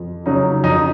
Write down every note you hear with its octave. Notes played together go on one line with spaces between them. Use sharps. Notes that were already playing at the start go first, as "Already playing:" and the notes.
Already playing: F2
C#3 F#3 D#4
F2 D#4